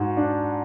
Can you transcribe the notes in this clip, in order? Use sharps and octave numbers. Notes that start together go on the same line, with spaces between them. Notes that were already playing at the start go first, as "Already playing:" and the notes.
Already playing: G#2 F#4
D4